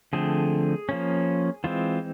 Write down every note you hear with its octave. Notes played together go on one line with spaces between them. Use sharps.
D3 F3 A3 C4 G#4
F3 A#3 C#4
E3 G#3 C4 F4